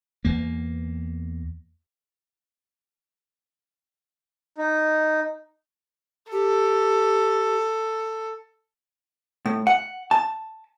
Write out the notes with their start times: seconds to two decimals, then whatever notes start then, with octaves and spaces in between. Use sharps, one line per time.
0.25 E2 A#3
4.58 D#4
6.32 G4 A4
9.46 A2
9.67 F#5
10.11 A5